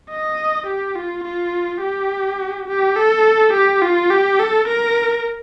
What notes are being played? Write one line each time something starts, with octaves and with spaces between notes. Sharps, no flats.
D#5
G4
F4
F4
G4
G4
A4
G4
F4
G4
A4
A#4